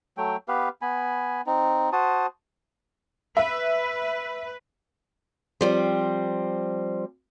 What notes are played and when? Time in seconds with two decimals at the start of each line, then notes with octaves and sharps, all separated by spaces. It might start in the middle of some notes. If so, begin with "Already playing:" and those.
0.17 F#3 A3 G5
0.48 B3 G4 B4 F5
0.82 B3 G#5 B5
1.46 C4 D#4
1.92 F#4 C5 A5 D#6
3.37 B4 E5
5.61 F3 G3 C4